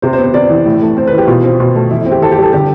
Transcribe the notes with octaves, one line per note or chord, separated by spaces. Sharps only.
C3 C5
C5
B3
C5
C3 D5
E3
A2
A3
C4 C5
B4
E3 G4
B2 F4
C4
B2
A3
E3 E4
E4
C4
G4
E3 A4
G4
G3 A4
D3 G4